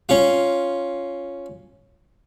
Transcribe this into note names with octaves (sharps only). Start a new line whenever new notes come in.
C#4 F4